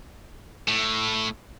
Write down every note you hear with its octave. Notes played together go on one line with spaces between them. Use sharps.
A2